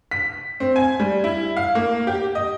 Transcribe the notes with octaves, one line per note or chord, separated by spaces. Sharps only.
B6
C4
G#5
G3
E4
F5
A#3
G4
D#5